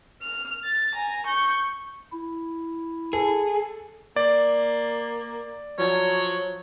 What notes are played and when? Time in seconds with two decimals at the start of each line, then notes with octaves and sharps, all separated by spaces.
0.22 F6
0.64 A6
0.95 G#5 A#5
1.27 C#6 G6
2.12 E4
3.13 G#4 A4
4.16 A#3 D5
5.79 F3 F#3 C#5